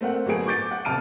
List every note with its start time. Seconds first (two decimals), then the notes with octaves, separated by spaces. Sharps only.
0.01 A3 C4 A#4 F#5
0.26 G1 F#3 A3 B3 G#4 D7
0.46 C#6 D6 G6 A6 D7
0.71 F#5
0.85 D#1 C3 A5 F6 D7 D#7